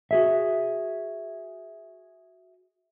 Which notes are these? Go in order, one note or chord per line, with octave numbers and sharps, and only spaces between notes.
F#4 G#4 E5